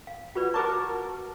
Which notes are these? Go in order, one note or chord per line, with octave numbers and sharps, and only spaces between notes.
F5
F4 F#4 B4 D5
F#4 A#4 A5 C#6 D6